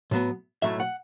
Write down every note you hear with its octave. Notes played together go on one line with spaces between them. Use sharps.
A2 F#3 B3
B1 A2 F#3 A3 E5
F#5